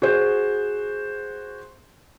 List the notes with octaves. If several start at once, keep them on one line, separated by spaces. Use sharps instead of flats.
F#4 G#4 C5